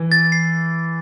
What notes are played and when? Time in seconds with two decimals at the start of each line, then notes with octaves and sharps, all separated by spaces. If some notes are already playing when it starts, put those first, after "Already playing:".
Already playing: E3
0.12 A6
0.32 C7